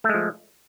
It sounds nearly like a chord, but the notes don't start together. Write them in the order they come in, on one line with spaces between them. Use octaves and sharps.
A3 G#3 F3